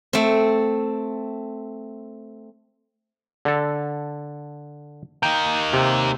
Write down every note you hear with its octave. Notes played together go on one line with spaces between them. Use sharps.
A3 C4
D3 A4
A#3 D#4 G5
C3